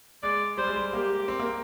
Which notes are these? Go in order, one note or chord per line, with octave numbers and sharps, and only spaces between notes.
G#3 D5
G3 C5
G#3
G3
A#3 G4
C4
A#3